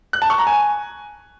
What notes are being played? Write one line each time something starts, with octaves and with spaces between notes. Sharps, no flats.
F#6
A5
C#6
A#5
G#5